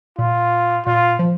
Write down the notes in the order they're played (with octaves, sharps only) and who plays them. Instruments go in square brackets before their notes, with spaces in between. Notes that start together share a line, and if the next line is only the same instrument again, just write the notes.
[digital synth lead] A#2 [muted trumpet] F4
[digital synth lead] A#2 [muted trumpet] F4
[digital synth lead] F3